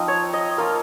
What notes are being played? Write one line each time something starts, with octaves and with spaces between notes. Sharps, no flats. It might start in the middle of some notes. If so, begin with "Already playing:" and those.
Already playing: F3 C4 D#4 D#5
C#5
D#5
A#3 F4 F5